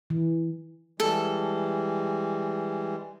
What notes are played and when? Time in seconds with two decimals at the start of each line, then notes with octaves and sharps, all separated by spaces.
0.10 E3
1.00 E3 G3 G#3 A4